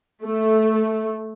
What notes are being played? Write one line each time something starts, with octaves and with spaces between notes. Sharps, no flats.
A3